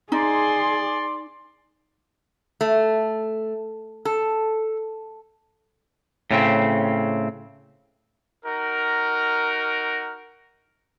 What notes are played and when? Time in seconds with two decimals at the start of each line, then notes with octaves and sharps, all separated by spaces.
0.12 D#4 G#4 D5 C6
2.61 A3
4.05 A4
6.31 A2 C#3 C4
8.45 D#4 F#4 A#4